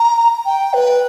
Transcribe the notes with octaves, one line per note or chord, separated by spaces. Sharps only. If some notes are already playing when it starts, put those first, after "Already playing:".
Already playing: A#5
G5
B4